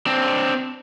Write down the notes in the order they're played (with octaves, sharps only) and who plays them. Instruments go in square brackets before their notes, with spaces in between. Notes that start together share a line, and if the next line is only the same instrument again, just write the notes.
[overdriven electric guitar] C4 D4